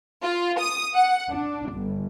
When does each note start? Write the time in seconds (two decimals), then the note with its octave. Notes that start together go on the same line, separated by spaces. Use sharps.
0.23 F4
0.59 D#6
0.94 F#5
1.29 D4
1.73 G1